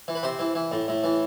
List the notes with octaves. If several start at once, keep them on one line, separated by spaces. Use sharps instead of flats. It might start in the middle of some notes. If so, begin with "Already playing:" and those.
E3
B4
C3 C5
E3
E3
A2
A2
E3